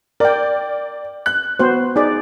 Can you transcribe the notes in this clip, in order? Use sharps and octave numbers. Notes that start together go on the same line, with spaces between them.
A#4 D5 G5
F#6
B3 F#4 C5
D#4 G#4 D5